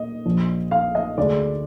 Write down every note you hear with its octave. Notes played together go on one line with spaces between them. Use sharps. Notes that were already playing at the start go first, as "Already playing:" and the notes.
Already playing: A#2 A#3 D#5
A#1 A#2 F3
F5
D#5
D2 D3 G#3 D5